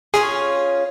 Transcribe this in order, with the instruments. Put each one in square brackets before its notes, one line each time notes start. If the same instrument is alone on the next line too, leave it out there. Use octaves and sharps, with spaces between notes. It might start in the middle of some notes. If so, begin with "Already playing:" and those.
[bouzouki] C#4 F4 C#5 [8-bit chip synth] G#4